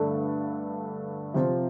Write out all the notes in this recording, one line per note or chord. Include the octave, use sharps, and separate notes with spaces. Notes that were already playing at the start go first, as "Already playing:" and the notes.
Already playing: G2 D3 A3 D4 A4
C3 F3 C4 F4